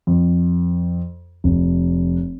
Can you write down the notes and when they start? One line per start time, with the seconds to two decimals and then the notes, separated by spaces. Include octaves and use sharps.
0.07 F2
1.44 F1